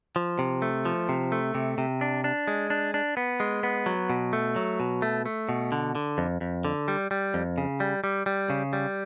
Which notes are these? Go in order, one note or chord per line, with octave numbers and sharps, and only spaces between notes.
F3
C3
A3
F3
C3
A3
C3
C3
D4
D4
G#3
D4
D4
B3
G#3
B3
F#3
B2
A3
F#3
B2
A3
A3
B2
D3
D3
F2
F2
D3
G3
G3
F2
C#3
G3
G3
G3
C#3
G3